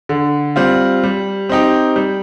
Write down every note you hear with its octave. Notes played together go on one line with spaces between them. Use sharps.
D3
G3 C4 F4
G3
C4 D#4 G4
G3